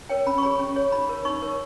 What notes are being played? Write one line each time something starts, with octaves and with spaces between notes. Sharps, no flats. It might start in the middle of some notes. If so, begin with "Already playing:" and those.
A#4 C#5 G5
C#4 B5
C#6
G#4 C#5 B5
C#4
G#4 C#5
D#4 B5
A#4 C#5
D#4 C#6
A#4 C#5